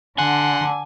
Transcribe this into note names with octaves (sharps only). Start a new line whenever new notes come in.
D3 F#5 G#5 C6 F#6